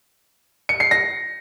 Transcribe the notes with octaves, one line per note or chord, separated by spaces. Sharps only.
C#7
C7
A#6